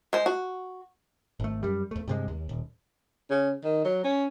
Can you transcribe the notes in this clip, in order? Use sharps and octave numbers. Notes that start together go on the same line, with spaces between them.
G#3 C5
F#4
G#1 A3
F#2 G3
E2 A3
G2 C3 G#3
D#2
D#1
C#3
D#3
F#3
C#4